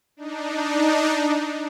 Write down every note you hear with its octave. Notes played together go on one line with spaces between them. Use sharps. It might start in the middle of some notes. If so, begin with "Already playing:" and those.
D4 D#4